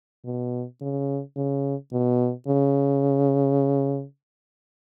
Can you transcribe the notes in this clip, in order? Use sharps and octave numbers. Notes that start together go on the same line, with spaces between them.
B2
C#3
C#3
B2
C#3